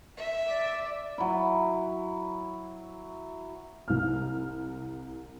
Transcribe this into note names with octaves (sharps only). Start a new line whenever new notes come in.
E5
D5
F#3 E4
C2 F6